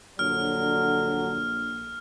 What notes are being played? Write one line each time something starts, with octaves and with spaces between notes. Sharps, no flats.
A#1 D3 F#3 F6